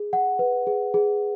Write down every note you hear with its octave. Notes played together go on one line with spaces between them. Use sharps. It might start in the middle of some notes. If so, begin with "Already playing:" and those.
Already playing: G#4
F#5
B4
G#4
G#4